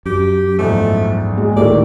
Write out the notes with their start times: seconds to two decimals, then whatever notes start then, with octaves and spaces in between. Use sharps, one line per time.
0.06 F#2 G4
0.59 A#1 E2 G#2 A3
1.38 G#3
1.56 D2 A2 D#3 A3 A#3 G4 D5